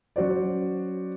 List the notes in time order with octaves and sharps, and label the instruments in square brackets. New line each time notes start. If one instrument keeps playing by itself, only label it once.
[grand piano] F#3 C#4 F#4 C5 D5